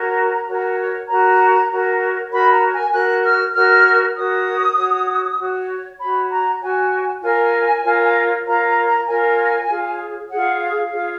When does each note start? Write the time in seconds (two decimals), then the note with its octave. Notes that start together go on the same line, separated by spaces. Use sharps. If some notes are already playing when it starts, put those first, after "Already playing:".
Already playing: F#4 A#4 C#5 A#5
0.46 F#4 A#4 C#5
1.08 F#4 A#4 C#5 A#5
1.69 F#4 A#4 C#5
2.31 F#4 A#4 C#5 B5
2.51 A#5
2.72 G#5
2.92 F#4 A#4 C#5 F#6
3.23 F6
3.54 F#4 A#4 C#5 F6
4.15 F#4 A#4 C#5 D#6
4.76 F#4 C#5
5.38 F#4 C#5
5.99 F#4 C#5 B5
6.30 A#5
6.61 F#4 C#5 G#5
7.22 F4 A#4 C#5 G#5
7.83 F4 A#4 C#5
8.45 F4 A#4 C#5 A#5
8.66 A#5
8.86 A#5
9.07 F4 A#4 C#5 G#5
9.68 F4 G#4 C#5
10.30 F4 G#4 C#5 F#5
10.60 F5
10.91 F4 G#4 C#5